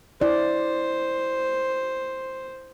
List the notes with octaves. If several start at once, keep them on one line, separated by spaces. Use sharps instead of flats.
E4 C5 D5